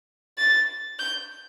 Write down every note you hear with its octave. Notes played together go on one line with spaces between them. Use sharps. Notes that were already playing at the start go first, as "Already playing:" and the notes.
A6
G6